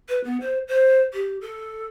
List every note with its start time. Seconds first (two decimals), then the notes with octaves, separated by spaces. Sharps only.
0.09 B4
0.24 B3
0.40 C5
0.68 C5
1.13 G4
1.41 A4